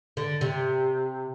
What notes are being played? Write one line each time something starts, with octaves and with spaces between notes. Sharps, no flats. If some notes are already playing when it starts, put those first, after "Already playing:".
D3
C3